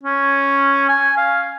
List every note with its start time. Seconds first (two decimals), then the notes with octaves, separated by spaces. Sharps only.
0.04 C#4
0.89 G#5
1.17 F5